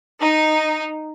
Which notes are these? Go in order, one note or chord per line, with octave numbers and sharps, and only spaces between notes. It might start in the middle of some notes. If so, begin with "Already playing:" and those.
D#4